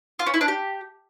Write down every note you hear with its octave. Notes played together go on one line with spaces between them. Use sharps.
F4
C#4
E4
D4
G4